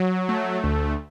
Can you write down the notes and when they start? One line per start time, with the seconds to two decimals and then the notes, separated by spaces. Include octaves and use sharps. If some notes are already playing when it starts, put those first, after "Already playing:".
Already playing: F#3
0.29 A3
0.64 D2